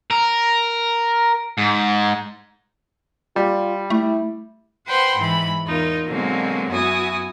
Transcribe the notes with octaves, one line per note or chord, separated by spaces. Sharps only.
A#4
G#2
G3 F4
A3 E4
B4 C5 F#5 G5 B5 C6
G#2 E3 B5
E2 D#4 F4 A#4
B2 D3 F#3 G#3 A#3 C4
F#2 B3 E4 F#4 G#5 D#6